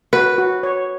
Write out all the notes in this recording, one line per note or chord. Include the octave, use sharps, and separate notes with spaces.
F#4 B4
F#4
C#5